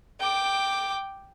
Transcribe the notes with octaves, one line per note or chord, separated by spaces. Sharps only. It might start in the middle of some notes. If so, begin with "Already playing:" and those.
G5 D6